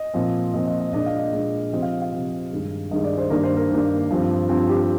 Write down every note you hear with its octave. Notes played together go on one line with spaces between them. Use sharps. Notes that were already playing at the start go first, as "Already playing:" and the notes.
Already playing: D#5
A#2 F3 C4
A#2 F3 C4 D#5
D#5
D#5
A#2 G#3 D4 D#5
F5
D#5
A#2 G#3 D4
C3 F3 C4 D#5
F5
F5
C3 F3 C4
G2 D#3 G#3
G2 D#3 G#3 D#5
D5
C5
G2 D#3 A#3 D4 A#4
C5
A#4
G2 D#3 A#3 D4
G2 F3 C4
G2 F3 C4
G4